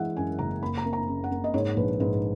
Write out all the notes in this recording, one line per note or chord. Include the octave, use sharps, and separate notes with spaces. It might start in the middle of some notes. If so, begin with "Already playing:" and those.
Already playing: E3 G#3 E5 F#5
F#2 G#5
F#1 A#5
A#3 B5
A#5
A#3
A#5
C#3
F#5
A#3
D#5
G#2 C#5
A#1 B4
G#2 B4